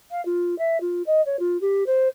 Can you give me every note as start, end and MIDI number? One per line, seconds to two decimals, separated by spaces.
0.11 0.23 77
0.25 0.57 65
0.58 0.77 76
0.81 1.02 65
1.06 1.21 75
1.26 1.37 73
1.39 1.60 65
1.61 1.86 67
1.86 2.08 72